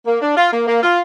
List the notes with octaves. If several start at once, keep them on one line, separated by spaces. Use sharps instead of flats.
A#3
D4
F4
A#3
A#3
F4